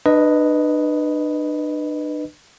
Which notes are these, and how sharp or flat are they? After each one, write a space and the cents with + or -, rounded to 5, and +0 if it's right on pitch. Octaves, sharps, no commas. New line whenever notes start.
D4 +40 B4 +0 D#5 +0